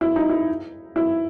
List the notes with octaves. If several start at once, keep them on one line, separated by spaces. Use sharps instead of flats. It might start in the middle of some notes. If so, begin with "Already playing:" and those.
E4
D#4
E4
E4